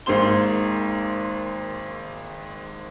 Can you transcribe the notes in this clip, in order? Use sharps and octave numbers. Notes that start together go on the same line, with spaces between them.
G#1 G#2 A#3 C5 C6 G7